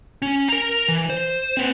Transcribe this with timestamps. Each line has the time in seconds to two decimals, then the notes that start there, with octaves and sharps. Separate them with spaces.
0.22 C#4
0.49 A#4 A#5
0.88 E3
1.10 C5
1.57 C4 B4